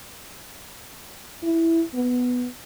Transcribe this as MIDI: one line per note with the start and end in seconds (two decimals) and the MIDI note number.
1.43 1.82 64
1.94 2.46 59